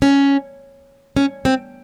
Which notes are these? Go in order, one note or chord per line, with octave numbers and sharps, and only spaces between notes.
C#4
C#4
C4